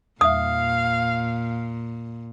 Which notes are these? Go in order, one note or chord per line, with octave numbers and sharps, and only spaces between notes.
E2 A#2 E5 F5 D#6